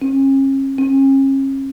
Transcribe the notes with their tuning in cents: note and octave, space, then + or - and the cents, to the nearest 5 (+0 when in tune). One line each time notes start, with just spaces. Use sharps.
C#4 -40
C#4 -40